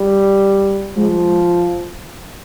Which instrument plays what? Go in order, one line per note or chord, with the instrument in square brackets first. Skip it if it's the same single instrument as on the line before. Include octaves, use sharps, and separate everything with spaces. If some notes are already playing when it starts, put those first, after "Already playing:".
Already playing: [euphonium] G3
[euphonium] F3 [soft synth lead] G#3